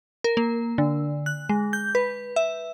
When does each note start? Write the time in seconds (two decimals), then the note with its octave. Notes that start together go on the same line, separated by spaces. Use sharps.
0.24 A#4
0.37 A#3
0.78 D3
1.26 F#6
1.49 G#3
1.73 G6
1.95 B4
2.36 E5